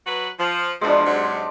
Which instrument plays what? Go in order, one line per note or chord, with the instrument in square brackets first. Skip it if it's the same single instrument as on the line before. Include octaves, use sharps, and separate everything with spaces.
[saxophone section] F#3 F#4 B4
F3
[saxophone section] E2 B2 F3 [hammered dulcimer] G#3 D4
[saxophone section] G#2 C3 F#3